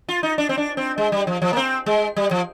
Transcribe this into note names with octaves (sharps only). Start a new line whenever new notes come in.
F4
D#4
D4
C4
D4
C4
G#3
G3
F3
F3
A#3
C4
G#3
G3
F3